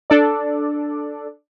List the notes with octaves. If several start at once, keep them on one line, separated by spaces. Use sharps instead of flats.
D4 A4 D5